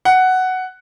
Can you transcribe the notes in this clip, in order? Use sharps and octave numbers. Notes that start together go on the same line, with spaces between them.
F#5